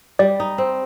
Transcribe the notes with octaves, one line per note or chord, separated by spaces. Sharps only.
G3 D5
D#4
C4